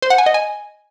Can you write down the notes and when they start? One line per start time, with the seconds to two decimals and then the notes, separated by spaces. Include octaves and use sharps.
0.02 C5
0.10 F#5
0.18 G#5
0.26 D#5
0.34 G#5